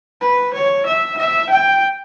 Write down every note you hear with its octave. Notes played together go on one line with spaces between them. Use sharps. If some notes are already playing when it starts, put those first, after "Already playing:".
B4
C#5
E5
E5
G5